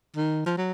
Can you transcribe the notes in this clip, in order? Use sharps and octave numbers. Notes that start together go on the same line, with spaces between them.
D#3
F3
F#3